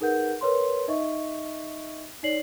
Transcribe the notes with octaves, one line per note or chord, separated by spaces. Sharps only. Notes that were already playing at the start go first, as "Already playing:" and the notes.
D#4 G#4 A#4 B4 F#5 G6
A#4 B4 C#5 C6
D#4 D#5 E5 C#6
D#4 C#5 D5 C7 F#7